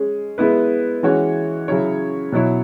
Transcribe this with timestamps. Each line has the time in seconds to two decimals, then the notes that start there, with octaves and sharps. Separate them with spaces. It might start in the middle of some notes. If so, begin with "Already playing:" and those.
Already playing: G#3 C#4 G#4
0.38 G#3 B3 E4 B4
1.03 E3 G#3 C#4 F#4 C#5
1.68 C#3 F#3 E4 C#5
2.32 B2 F#3 E4 C#5